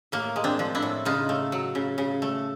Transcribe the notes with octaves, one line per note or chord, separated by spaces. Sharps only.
A2 A#3
G#3
C4 D4
F3
D4 E4
A2
C#3 D#4 F4
A3
F#3
C#3
C#3
A3